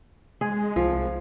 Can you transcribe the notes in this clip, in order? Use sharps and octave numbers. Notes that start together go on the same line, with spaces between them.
G#3 G#4
C2 F3